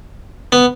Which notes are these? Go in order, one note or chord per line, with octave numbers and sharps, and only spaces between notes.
B3